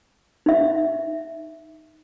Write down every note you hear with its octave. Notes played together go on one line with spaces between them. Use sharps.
D#4 E5